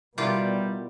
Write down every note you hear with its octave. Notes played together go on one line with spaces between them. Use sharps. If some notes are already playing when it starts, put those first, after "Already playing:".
B2 G3 E4 F4 G4 A#4 D5